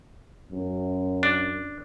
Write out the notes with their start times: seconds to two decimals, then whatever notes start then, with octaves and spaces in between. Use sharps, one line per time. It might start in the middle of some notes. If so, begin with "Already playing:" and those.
0.52 F#2
1.23 D4